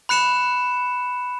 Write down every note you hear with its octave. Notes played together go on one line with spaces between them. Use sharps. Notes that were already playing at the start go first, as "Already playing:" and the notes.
B5 F#6 C#7 E7